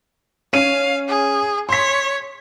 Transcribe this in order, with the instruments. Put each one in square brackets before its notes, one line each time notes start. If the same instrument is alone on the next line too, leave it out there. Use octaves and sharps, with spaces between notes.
[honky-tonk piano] C#4 D#7 [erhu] F5
[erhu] G#4
[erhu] C#5 [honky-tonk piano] C6 B6